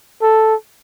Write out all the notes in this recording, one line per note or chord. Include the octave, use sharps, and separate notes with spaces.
A4